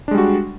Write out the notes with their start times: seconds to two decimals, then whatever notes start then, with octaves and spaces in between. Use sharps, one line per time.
0.08 D4
0.11 G#3
0.15 G3
0.18 F#4